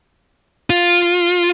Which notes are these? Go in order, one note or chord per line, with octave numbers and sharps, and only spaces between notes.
F4